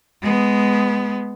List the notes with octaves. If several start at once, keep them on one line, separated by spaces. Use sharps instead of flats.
G#3 B3